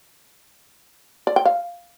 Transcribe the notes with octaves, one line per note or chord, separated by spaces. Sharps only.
D5
G5
F5